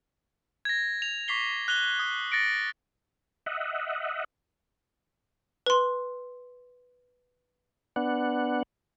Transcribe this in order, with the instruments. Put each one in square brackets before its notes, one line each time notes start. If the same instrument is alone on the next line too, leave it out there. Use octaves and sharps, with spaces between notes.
[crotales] G#6 A#6
F7
C#6 D6 B6 C7 G7
F#6 F7 G7
D#6 G#6
A6 A#6 C#7 D7
[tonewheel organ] D#5 E5 F#5
[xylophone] B4 C6
[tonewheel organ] B3 D4 F#5